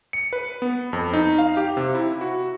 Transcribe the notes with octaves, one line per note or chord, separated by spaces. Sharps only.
C#7
B4
B3
F2
D#4
F5
G4
C3
E4
F#4